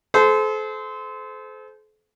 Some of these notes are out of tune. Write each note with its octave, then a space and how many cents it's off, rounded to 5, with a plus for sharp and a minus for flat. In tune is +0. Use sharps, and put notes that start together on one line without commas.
A4 -40 C5 -20